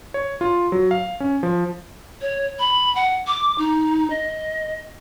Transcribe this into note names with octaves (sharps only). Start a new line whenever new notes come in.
C#5
F4
F#3
F5
C#4
F3
C#5
B5
F#5
D6
D#4
D#5